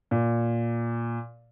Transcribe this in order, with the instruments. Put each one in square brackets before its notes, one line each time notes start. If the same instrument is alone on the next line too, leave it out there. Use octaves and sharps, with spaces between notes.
[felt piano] A#2